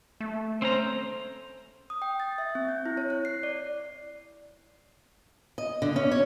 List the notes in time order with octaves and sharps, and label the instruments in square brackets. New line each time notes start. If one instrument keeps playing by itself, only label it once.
[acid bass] A3
[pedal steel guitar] C4 C#4 A#5 [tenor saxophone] C5
[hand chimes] D#6
G5
A6
E5
C4
G6
E4
C#5
F#6
C7
D5
[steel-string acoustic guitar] D#5
D3
C#4
C#5